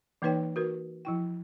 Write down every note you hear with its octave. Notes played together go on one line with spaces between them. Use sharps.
E3 A#3 D#4 B4 C#5 G5
F#4 A#4 B4
F3 E4 G5